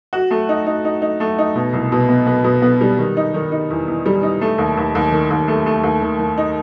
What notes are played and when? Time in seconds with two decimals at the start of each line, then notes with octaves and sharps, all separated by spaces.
0.13 F#4
0.31 A3
0.49 D#4
0.66 D#4
0.85 D#4
1.02 D#4
1.20 A3
1.38 D#4
1.55 B2
1.73 C2
1.92 B2
2.09 B3
2.27 B3
2.44 B2
2.62 B3
2.81 G3
2.98 D#3
3.17 D#4
3.34 D#3
3.52 D#4
3.70 E2
3.88 E2
4.06 G3
4.23 D#4
4.41 A3
4.58 D#2
4.77 D#2
4.95 D#2
5.12 D#3
5.31 D#2
5.48 A3
5.66 A3
5.83 D#2
6.01 D#3
6.19 D#3
6.38 D#4